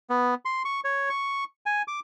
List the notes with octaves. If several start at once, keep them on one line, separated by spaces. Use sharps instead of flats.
B3
C6
C#6
C#5
C#6
G#5
D6